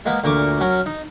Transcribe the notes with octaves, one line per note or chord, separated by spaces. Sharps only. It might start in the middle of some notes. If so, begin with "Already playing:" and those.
G#3 A#3 B3
D2 A#2 A#4 C#6 D6
F#3 C#4 A#4
D#4